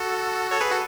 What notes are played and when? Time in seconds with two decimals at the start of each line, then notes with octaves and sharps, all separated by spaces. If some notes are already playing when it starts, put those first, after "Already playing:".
Already playing: F#4 A4
0.51 A4 C#5
0.61 G#4 B4
0.71 F#4 A4